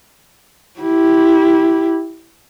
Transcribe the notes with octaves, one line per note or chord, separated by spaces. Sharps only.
E4 G4